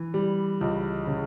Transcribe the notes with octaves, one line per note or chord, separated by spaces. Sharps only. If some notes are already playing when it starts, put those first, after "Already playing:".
Already playing: E3
G3
C#2
C#3